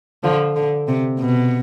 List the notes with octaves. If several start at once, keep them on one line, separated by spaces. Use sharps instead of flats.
D3 F3
D3
C3
B2